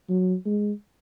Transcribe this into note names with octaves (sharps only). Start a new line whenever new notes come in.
F#3
G#3